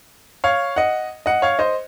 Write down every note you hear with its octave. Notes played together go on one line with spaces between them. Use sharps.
C#5 F5
D#5 F#5
D#5 F#5
C#5 F5
C5 D#5